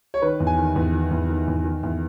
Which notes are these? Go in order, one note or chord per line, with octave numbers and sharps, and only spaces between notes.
C#5
D#3 B4
E2
G#5
D#3
E2
D#3
E2
D#3
E2
D#3
E2